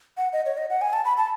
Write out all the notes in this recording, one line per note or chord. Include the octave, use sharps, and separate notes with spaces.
F#5
D#5
C#5
D#5
F#5
G#5
A5
B5
A5